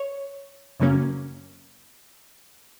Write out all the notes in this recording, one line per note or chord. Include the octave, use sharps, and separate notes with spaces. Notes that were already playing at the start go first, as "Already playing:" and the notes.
Already playing: C#5
F#2 C#3 F#3 A#3 C#4